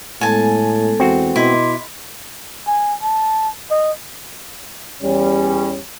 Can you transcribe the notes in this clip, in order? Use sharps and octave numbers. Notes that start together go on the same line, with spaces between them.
A2 G#3 B3 A4 G#5 A5
E2 C4 F#4
B2 E4 D#5 C6 D6
G#5
A5
D#5
E2 G3 C#4